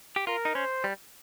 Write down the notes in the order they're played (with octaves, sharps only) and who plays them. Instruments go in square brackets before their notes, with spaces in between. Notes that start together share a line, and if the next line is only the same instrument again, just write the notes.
[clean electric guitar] G4
[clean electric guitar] F4 [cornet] A#4
[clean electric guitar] D#4
[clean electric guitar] C#4 [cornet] C5
[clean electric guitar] G3